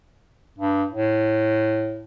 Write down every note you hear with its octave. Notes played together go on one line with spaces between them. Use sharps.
G2
A2